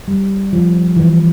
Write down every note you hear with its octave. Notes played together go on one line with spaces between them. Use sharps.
G3
F3
E3